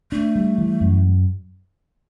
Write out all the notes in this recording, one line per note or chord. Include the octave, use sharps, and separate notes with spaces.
A3 D4
G3
E3
F#2